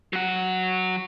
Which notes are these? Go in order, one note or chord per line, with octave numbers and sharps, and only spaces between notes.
F#3 F#5